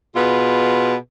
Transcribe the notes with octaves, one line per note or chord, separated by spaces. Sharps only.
B2 F4 G#4 B4